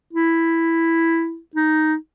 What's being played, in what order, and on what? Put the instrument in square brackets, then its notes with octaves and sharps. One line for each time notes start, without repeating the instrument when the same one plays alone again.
[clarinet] E4
D#4